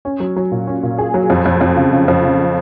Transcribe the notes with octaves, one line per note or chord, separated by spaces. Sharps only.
C#4
F#3
F#3
A#2
C#4
A#2
G#4
F#3
F2
F2
F2
C#3
C#3
F2
C#3